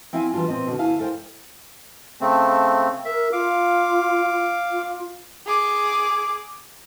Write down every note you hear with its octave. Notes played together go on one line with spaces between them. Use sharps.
C4 E4 E5 F5 G#5
E3 G3 G#3 D4 F4
A#2 C4 D#5
B2 D3
D2 E4 F5 G#5 A5
A4 A#4 C5 D5 G5
C#3 A3 C4 A5
A#4 E5
F4 F5 D6
F4
G#4 D6